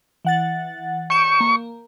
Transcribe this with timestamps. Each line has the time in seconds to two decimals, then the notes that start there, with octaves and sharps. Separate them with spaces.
0.25 E3 F#5 A6
1.10 C#6 G6 D7 E7
1.40 A#3